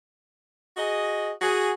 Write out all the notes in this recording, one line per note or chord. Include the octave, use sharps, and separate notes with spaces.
F#4 G#4 D#5
F#4 G#4